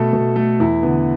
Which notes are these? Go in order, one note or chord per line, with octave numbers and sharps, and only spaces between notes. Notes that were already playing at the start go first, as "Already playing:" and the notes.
Already playing: B2 A3 A4
B2
A3
E2 E4
D3 B3